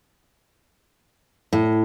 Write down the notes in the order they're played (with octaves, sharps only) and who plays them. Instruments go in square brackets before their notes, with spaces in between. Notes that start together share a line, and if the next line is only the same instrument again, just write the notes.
[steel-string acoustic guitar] A2